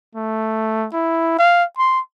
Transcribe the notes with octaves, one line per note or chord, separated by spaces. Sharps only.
A3
E4
F5
C6